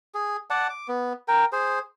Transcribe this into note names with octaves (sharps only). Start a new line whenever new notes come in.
G#4
D5 F#5 A5
D6
B3
A#4 G5
G#4 C5